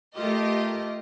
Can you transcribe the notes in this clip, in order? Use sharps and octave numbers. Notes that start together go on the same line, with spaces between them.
A3 F4 G4 A#4 D#5